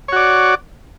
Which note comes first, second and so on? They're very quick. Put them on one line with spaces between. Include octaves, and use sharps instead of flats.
C#5 F#4 D5